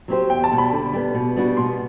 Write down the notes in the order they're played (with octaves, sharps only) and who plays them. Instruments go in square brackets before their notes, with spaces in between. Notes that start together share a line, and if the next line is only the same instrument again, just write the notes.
[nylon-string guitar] F#3 C4 G4 C5
[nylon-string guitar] E2 [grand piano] G5
[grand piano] A5
[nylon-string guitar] B2 G3
[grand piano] B5
[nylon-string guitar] D3
G3 B3
B2
G3 B3 D4 F#4
[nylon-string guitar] B2 [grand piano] C6